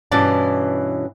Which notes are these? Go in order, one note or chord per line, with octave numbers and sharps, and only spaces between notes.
G2 B2 E3 C#4 D5 A5